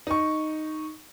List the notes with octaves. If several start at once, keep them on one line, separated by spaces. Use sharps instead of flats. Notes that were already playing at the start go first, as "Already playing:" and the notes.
D#4 C#6